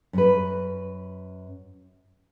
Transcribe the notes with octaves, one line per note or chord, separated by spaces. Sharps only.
F#2 B4